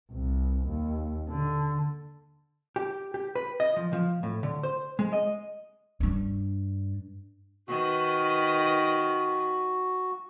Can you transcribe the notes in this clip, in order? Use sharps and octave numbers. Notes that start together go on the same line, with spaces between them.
C2
D#2
D3
G4
G4
B4
D#5
F3
F3
A2
D3
C5
G#3
D#5
G2 D4
D#3 F#4 B4